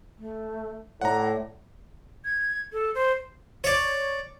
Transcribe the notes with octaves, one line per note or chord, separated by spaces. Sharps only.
A3
A2 D5 F#5 A#5
G#6
A4
C5
C#5 D5